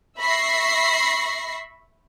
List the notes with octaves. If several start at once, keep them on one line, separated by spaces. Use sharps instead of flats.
E5 B5 C#6 A#6 C7